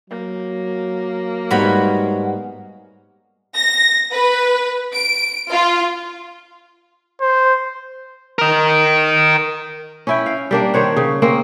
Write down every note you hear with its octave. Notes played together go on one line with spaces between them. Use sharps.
F#3 A#3
G#2 G3 B3 F#4 C#5 B5
A#6
B4
D7
F4
C5
A#4 D#5
C#4 E4 G5
F5
G3 A#3 D4
D#3 C5 C#5 F#5
C#3
A#3 C4 C#4